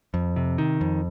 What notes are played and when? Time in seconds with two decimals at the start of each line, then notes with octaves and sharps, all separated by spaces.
0.14 F2
0.36 C3
0.58 D#3
0.81 F2